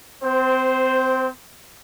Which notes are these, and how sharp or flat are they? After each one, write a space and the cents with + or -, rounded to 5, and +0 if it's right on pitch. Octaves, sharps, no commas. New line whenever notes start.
C4 -25 C5 +0